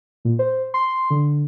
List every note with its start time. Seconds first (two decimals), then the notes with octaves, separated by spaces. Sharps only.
0.25 A#2
0.39 C5
0.74 C6
1.10 D3